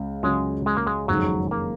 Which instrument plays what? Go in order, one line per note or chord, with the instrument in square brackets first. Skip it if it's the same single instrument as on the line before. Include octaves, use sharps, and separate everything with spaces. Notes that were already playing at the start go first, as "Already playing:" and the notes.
Already playing: [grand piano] C#2 C#3
[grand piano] C#2 C#3 F#3 C#4 F#4 [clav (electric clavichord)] G#3
[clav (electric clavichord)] G#3
A#3
G#3
[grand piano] F#1 F2 D#3 G#3 D#4 [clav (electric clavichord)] F#3
[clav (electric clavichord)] A#3